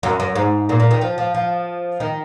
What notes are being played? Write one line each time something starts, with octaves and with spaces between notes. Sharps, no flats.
F#2
F#2
G#2
A#2
A#2
D#3
F3
F3
F3
D#3